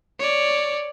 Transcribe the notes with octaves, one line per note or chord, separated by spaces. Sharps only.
C#5 D5